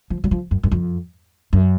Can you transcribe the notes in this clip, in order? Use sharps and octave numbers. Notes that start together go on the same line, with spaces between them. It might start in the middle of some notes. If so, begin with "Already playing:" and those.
F3
F#3
F3
F#2
F#2
F2
F#2